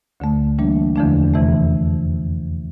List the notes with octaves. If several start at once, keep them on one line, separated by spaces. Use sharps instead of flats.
D2 D3 A3
E3 G3 A#3 D4
E2 D3 F3 A3 D4
F2 C3 E3 A3